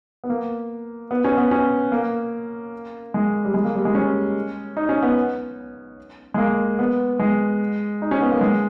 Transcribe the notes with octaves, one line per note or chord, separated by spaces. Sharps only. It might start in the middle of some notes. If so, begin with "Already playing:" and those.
B3
A#3
B3
C#4
B3
C#4
A#3
G#3
G3
G#3
A#3
G3
G#3
C#4
D#4
C#4
B3
G#3
A#3
B3
G#3
D#4
C#4
B3
A#3
G#3